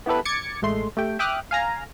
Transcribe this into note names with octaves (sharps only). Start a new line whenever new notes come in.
B3 E4 G4 A4 B4
D6 G#6 A6 C#7
A1 G#3 A3 C6
A3 G4 G5
E5 G5 D6 D#6 F6 F#6
F5 G#5 A#5